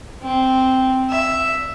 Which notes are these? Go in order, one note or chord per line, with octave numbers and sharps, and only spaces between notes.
C4
E5